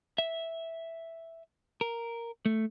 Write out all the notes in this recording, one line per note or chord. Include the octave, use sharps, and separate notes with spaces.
E5
A#4
A3